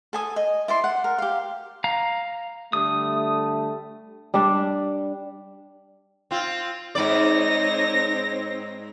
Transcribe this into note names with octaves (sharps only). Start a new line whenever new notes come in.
A4 G#5 D#6
D#5
E4 D5 C6
F#5
A#4
G4 F5
F5 A#5
D3 G3 A3 D#6
G3 D4
C4 F4
G#2 C4 D#4 C#5 D5 A#6